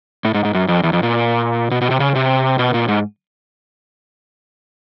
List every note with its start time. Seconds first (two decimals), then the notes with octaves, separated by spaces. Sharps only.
0.25 A2
0.34 G#2
0.45 G#2
0.54 F#2
0.68 F2
0.83 E2
0.93 F2
1.03 A#2
1.71 B2
1.81 B2
1.91 C3
2.00 C#3
2.15 C3
2.59 B2
2.74 A#2
2.88 G#2